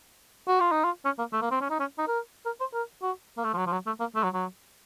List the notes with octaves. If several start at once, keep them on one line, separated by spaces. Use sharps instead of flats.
F#4
F4
D#4
F4
C#4
A#3
A3
A#3
C4
C#4
D#4
C#4
D#4
A#4
A#4
C5
A#4
F#4
A#3
A3
F3
F#3
F3
F#3
A3
A#3
A3
F#3
F#3